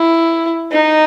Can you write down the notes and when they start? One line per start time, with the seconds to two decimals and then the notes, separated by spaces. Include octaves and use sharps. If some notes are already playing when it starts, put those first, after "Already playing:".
Already playing: E4
0.72 D#4